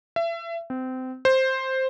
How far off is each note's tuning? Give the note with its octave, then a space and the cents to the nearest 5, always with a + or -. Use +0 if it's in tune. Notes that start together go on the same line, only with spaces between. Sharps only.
E5 +30
C4 -25
C5 +5